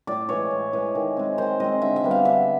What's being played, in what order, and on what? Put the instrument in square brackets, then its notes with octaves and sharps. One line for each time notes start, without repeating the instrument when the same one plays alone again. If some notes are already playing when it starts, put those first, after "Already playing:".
[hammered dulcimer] A2 D5
E3 G#3 C#5
A2
E3 G#3
D#3
G#3 C4
D#3 C5
G#3 C4 D#5
D3 E5
E5
G3 B3
F5
D3 E5